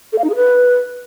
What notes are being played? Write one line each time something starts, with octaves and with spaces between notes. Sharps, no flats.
A4
F5
D#4
G#4
B4